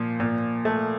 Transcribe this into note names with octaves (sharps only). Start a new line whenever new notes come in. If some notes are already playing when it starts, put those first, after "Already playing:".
Already playing: A#2 F3
A#2
A3